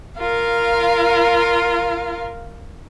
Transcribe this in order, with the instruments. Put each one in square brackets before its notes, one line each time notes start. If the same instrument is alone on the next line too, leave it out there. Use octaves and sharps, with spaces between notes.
[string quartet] F4 A#4 F5